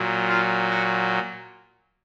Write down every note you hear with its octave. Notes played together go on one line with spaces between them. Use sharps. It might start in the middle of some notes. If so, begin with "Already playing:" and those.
Already playing: A#2 F#3
F4
F#4